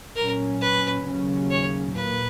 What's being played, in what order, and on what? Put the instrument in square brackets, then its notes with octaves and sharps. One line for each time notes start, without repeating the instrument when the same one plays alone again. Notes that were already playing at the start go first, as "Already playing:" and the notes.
[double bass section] A#2 F#3 C#4 [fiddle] A#4
[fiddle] B4
[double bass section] D#2 C#3 F#3 C#4
[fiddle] C#5
[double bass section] A#2 A#3 [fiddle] B4